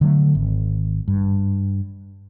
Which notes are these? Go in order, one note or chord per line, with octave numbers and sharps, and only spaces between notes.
D3 F#3 A3
G#1
G2